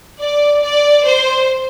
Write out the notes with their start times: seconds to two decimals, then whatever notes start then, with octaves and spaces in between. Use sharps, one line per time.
0.19 D5
0.62 D5
1.05 C5